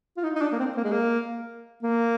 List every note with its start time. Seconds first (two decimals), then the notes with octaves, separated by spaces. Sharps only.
0.17 F4
0.24 D#4
0.36 D#4
0.41 D4
0.52 A#3
0.59 C4
0.77 A#3
0.84 G#3
0.91 A#3
1.83 A#3